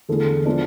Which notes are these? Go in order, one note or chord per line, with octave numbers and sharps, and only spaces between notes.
E2 D3 A3 E4 G#4
F3 G#3 B3 D4